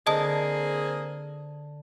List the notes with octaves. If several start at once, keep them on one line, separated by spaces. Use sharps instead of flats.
D3 A#3 C4 G#4 D#5 A5 D#6